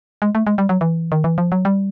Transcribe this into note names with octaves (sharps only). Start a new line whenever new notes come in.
G#3
A3
G#3
G3
F#3
E3
D#3
E3
F3
F#3
G3